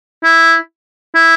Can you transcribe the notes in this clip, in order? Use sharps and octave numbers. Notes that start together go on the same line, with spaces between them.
E4
E4